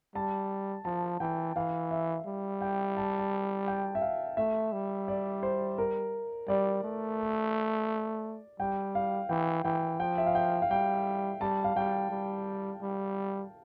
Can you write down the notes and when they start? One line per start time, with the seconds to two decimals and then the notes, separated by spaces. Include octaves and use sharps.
0.15 G3 A5
0.85 F3 A5
1.20 E3 G5
1.56 E3 F5
1.91 E5
2.26 G3
2.61 G5
2.97 A5
3.19 A5
3.67 G5
3.95 E5
4.02 F5
4.37 A3 E5
4.73 G3
5.08 D5
5.43 C5
5.78 A#4
6.48 G3 D5
6.84 A3
8.60 G3 G5
8.95 F5
9.29 E3 G5
9.65 E3 G5
10.00 F3 G5
10.18 E5
10.26 F5
10.35 G5
10.62 F5
10.71 G3 G5
11.41 G3 A5
11.64 F5
11.76 G3 G5
12.11 G3
12.82 G3